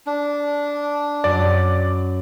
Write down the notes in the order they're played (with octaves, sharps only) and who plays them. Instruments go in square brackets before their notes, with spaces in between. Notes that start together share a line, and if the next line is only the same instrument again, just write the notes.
[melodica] D4
[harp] F#2 [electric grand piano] D5